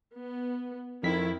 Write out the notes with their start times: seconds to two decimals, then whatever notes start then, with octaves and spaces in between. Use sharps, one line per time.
0.16 B3
1.03 F2 D#3 C4 E4 B6